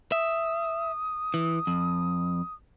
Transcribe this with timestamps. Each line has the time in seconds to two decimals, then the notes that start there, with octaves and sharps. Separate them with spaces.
0.12 E5 D#6
1.34 E3
1.67 F2